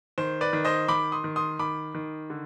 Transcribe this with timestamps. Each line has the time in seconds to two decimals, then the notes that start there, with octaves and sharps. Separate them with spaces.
0.18 D#3 C5
0.41 B4 D5
0.53 D#3
0.65 C5 D#5
0.88 D#3 B5 D6
1.12 C6 D#6
1.24 D#3
1.36 C6 D#6
1.59 D#3 B5 D6
1.95 D#3
2.30 D3